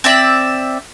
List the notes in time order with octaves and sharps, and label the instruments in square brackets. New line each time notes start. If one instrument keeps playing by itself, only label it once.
[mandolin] C4 D5 E5